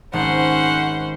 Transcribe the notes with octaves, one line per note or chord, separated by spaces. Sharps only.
G#1 D#3 C#4 C5 F#5